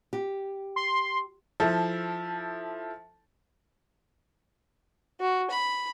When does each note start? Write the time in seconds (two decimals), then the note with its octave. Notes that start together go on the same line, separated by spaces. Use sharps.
0.13 G4
0.76 C6
1.60 F3 E4 A4
5.20 F#4
5.50 B5